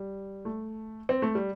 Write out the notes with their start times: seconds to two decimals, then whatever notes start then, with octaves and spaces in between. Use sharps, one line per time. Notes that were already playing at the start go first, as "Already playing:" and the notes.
Already playing: G3
0.45 A3
1.09 C4
1.22 A3
1.35 G3